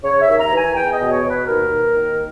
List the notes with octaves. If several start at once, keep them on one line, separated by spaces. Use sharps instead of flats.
C#3 C#5
E5
D#2
A#5
E3
G#5
E2 G5
D#5
B2
C#5
B2
B4
D#2 A#4
D#2
D#3